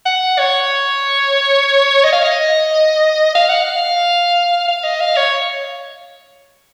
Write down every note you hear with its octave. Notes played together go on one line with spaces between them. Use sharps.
F#5
C#5
D#5
F5
D#5
F5
F#5
F5
F5
D#5
F5
C#5